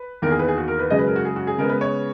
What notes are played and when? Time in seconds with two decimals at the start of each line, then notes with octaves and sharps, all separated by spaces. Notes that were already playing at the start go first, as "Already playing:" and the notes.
Already playing: B4
0.22 E2 D#3 A#3 A#4
0.31 G#4
0.39 B4
0.48 G#4
0.57 F#4
0.68 A#4
0.79 B4
0.90 F#2 C#3 G#3 D#5
0.99 B4
1.08 A#4
1.16 F#4
1.25 G#4
1.36 F#4
1.47 G#4
1.58 C#3 G#3 B3 A#4
1.69 B4
1.81 C#5